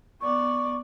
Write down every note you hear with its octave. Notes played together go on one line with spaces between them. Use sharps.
B3 D5 C#6